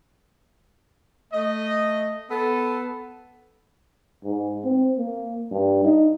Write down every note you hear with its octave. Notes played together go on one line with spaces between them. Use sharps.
A3 D#5
B3 A4
G#2
C4
A#3
G2
D#4